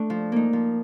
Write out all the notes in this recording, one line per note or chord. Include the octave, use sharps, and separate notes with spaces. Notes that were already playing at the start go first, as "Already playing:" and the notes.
Already playing: A3 D4
F3
A#3 D#4
F3